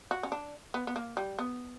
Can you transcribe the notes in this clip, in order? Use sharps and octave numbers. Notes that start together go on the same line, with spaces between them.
F#4
C#4
D4
B3
B3
A#3
G3
B3